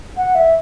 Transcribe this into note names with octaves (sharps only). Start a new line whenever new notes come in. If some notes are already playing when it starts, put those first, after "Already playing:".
F#5
E5